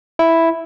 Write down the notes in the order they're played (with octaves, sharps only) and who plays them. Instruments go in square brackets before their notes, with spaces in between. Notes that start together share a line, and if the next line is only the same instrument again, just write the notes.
[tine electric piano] E4